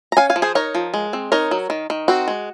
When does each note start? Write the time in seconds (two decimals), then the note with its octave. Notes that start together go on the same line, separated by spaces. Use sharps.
0.12 A#5
0.17 C#4 F5 G#5
0.30 F5 G#5
0.36 F3
0.42 G#4 C5
0.55 D#4 A#4 C#5
0.75 F3
0.94 G#3
1.13 C4
1.32 D#4 A#4 C#5
1.51 F#3
1.70 D#3
1.90 D#3
2.08 C4 F#4
2.28 G#3